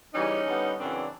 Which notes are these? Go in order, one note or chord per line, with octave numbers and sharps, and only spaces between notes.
C#3 E3 G3 C#4 D#4
D3 G3 B3
F#2 C#3 E3 C4 D4